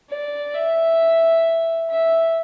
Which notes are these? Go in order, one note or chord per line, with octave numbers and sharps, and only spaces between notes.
D5
E5
E5